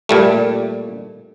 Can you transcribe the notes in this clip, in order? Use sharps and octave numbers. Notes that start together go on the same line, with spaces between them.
A#2 G3 A3